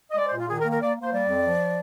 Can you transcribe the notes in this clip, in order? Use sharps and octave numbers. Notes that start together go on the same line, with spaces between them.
D#5
G#3 D5
C5
A#2 F4
D#3 G#4
A#4
A#3
A#4
A#3 D5
A#3 C5
G3 D5
F2
F3